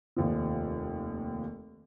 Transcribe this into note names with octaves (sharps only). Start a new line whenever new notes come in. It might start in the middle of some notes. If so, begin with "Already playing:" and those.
F1 D#2 F3